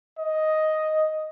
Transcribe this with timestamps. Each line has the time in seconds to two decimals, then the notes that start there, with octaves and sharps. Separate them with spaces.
0.19 D#5